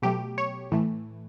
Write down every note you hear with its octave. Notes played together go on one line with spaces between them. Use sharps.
B2 F#3 A3 G4
C#5
A2 E3 A3